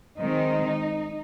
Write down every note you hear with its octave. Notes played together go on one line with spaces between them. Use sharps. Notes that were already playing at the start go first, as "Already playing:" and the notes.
D#3 G#3 C4 D#4